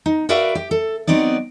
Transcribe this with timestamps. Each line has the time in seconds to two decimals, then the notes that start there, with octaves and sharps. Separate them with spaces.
0.06 D#4
0.29 F#4 A#4 B4 D5 E5 F5
0.55 G4
0.71 A4
1.07 F#3 B3 C4 D#4 D5